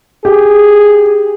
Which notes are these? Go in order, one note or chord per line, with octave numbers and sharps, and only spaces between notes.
G4 G#4